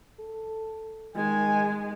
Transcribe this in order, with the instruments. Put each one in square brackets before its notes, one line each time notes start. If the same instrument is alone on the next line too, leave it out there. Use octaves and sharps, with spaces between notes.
[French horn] A4
[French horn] D#3 [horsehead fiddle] G#3 [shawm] G#5